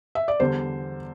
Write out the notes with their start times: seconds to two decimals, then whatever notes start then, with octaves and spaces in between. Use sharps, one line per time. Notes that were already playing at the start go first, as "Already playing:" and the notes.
0.15 E5
0.28 D5
0.40 E2 D3 G3 C5